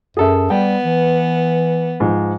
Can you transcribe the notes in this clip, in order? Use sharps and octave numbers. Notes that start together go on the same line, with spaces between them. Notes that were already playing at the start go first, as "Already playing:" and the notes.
F#2 G#4 A4 E5
G3 B3 G5
E3
G#2 F3